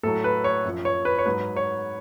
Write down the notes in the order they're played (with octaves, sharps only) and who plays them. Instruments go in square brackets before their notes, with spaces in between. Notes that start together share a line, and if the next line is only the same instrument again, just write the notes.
[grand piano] A2 F#3 A4
B4
C#5
F#2 F3
C#5
B4
C#5
G#2 F#3 B4
C#5